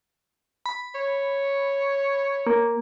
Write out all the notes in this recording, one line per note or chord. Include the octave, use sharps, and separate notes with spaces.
B5
C#5
A#3